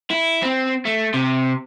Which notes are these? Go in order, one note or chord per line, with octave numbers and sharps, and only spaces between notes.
E4
C4
A3
C3